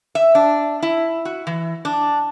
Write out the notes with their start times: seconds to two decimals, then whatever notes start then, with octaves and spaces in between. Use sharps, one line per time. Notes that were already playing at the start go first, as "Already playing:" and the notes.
0.15 E5
0.35 D4
0.83 E4
1.25 F#4
1.47 E3
1.85 D4